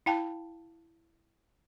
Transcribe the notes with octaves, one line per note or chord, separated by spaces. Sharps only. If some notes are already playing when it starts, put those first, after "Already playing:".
E4 F5 G5 A5